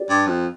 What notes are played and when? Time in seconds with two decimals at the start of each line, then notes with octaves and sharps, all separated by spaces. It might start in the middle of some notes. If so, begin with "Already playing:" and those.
Already playing: G4 D5
0.09 G2
0.27 F2